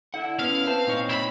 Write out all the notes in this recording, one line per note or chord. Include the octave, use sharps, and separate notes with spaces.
D3 E4 F#5
B3 C#4 F5
E3 C4 B4 A5
A#2 D#4 C#5
E4 B5